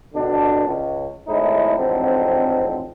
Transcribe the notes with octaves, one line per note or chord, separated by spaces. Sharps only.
C#2 B2 D3 D4
C#2
G#1 A2 G#3 D#4 E4
A1 F2 G#2 D3 C4